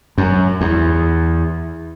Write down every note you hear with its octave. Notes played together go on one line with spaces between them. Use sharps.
F#2
E2